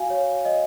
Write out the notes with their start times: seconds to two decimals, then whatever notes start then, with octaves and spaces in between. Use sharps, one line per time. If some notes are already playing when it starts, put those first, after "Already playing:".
Already playing: F#4 F5 G#5
0.10 C#5
0.45 D#5